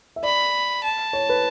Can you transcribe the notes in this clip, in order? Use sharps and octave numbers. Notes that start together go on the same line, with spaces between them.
E5
D5 B5
A5
C#5
B4